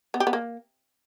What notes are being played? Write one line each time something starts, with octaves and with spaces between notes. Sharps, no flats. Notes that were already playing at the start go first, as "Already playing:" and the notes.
B3
G4
B3
A#3